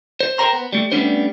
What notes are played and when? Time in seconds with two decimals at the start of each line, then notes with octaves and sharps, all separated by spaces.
0.20 C5
0.38 A#4 C5 G5 A#5 C6
0.53 B3
0.73 G3 A3
0.92 G3 A3 B3 C#4 D4 C5